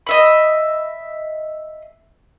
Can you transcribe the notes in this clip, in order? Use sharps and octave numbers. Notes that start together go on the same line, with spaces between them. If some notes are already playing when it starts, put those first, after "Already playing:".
D#5 E5 B5